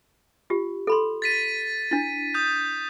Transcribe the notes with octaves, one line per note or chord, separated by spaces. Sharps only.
F4 G4
A4 B5 C6
A6 B6 D#7
D4 E4
D#6 G6